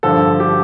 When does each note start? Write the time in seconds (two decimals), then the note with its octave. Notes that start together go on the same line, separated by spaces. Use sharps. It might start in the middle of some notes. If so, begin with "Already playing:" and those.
0.03 G2 D3 F3 A4
0.40 G4